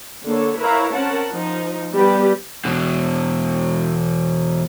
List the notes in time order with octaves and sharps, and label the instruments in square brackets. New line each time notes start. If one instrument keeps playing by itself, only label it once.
[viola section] D3 A#3 A4 C#5
E4 A#4 B4 C#5 F5 A#5
C4 C#4 A#4 F#5 A5
F3 D#4
G3 B3 G4 B4
[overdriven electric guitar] E2 B2